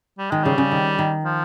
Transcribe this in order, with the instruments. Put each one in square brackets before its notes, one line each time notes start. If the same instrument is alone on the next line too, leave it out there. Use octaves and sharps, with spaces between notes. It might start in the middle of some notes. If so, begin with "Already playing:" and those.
[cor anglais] G3
[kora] D#3 [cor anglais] G#3
[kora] C#3 [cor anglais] G3
[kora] C#3
D#3
D#3
[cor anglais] F3